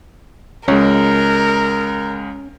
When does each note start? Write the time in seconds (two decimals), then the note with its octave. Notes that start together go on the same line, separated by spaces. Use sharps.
0.68 C#2 G#3 C#4 A#4